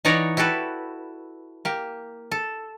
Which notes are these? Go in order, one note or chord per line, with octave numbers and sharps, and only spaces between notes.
E3 D#4 C#5 D5 F#5 A#5
E4 F#4 G4 A4 B4
A#3 G4
A4